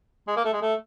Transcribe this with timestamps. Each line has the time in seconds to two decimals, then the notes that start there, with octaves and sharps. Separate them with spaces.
0.28 G#3
0.36 A#3
0.45 A3
0.53 G#3
0.62 A3